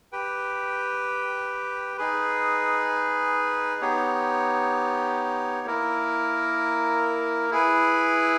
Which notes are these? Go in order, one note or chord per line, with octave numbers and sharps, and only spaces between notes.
G4 B4 G5
D#4 G#4 B4
B3 D#4 G4 C#5
A#3 E4 A#4
E4 G#4 B4